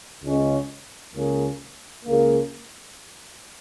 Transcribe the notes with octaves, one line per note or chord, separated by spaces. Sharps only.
C#2 C#3 G#3 C#4
C#2 C#3 A#3 C#4 G#4
C#2 C#3 A#3